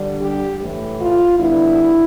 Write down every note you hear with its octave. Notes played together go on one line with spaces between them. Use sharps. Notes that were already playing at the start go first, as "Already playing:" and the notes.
Already playing: D3 G3 D4
G4
A2 E3 A3
F4
D3 G3 B3 D4 E4